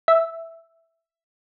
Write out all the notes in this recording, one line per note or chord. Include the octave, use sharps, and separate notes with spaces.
E5